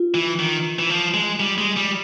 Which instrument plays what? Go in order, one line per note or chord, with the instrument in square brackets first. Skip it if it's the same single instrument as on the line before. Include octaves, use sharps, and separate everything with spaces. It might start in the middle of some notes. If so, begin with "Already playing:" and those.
Already playing: [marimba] F4
[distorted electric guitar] E3
D#3
E3
F3
G#3
G3
G#3
G3